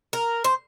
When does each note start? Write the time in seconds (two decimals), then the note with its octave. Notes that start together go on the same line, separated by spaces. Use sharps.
0.13 A#4
0.44 C5